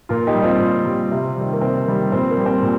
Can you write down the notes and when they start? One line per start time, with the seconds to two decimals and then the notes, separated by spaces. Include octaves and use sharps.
0.09 A#2 F4 A#4
0.27 D#4 G4
0.35 G3
0.44 C4 F4
0.60 A#2
0.85 G3
1.11 C3
1.37 D#3 G3
1.52 A#3
1.61 C3 C4
1.87 D#3 G3
2.12 A#2 C4
2.30 A#3
2.38 G3
2.46 C4
2.63 A#2